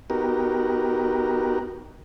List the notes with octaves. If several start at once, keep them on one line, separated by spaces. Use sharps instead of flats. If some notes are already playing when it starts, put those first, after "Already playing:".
B3 D#4 F#4 G4 A#4